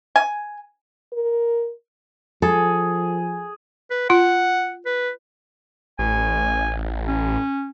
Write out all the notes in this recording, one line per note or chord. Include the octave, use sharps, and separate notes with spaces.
G#5
A#4
F3 G#4 A4
B4
F4 F#5
B4
A1 G#5
C#4